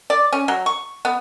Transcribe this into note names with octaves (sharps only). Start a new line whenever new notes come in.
D5
C#4
F#3
C#6
B3